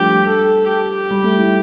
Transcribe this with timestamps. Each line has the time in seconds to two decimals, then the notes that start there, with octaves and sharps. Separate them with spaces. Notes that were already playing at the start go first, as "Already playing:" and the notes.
Already playing: F3 G3 A3 D4 G4
0.27 A4
0.68 G4
1.11 G3
1.24 A3
1.38 E4